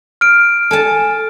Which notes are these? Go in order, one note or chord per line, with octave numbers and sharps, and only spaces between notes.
F6 D7
A4 G#5 A5